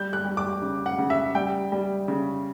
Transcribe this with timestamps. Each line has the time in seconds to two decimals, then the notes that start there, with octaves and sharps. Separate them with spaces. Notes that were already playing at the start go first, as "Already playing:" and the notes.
Already playing: G3 G6
0.13 F#6
0.24 G3
0.37 D6
0.62 C#3
0.86 F#5
0.98 C#3
1.10 E5
1.35 G3 G5
1.72 G3
2.08 C#3